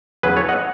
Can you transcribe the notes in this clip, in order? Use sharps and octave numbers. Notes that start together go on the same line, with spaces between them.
E2 C#3 F#3 G#4 B4
A4 C#5
D#5 F#5